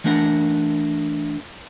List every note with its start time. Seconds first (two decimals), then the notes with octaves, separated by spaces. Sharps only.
0.04 E3 A3 D4 A#4 F#5